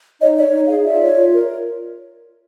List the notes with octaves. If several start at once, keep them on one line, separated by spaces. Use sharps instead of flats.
D#4 C#5 D#5
C#5 D5 E5
D#4
G#4 D#5 F5
F4 D5 E5
C#5
F4
A#4